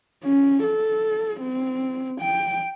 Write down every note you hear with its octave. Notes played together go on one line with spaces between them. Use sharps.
C#4
A4
C4
G5